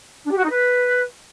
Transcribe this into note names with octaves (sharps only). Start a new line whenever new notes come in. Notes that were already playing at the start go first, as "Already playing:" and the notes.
D4
G4
F#4
D#4
B4